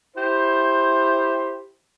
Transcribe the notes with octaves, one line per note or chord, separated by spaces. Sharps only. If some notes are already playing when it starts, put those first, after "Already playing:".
E4 G4 C5